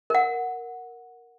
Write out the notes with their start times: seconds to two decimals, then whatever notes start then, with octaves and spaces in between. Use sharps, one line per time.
0.10 A#4 F#5